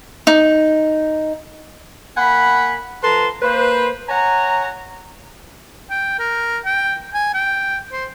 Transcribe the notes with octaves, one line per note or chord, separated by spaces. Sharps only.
D#4
A#3 F#5 G#5 B5
F3 A4 B4 A5 A#5 C6
A#3 B4 C5
C#5 F#5 G#5 A#5
G5
A#4
G5
G#5
G5
C5